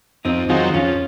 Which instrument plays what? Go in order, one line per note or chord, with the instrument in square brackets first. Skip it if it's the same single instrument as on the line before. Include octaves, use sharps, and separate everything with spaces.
[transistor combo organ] F2 [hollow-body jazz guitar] C4 D#4
[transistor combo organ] D#3 F#3 C4 [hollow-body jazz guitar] F4 G#4
[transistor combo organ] F2 [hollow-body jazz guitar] C#4 F4